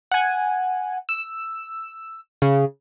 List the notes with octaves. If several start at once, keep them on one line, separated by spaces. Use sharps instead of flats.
F#5 G#5
E6
C#3